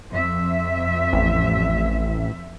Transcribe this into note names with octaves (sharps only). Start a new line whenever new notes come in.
F2 E5
A1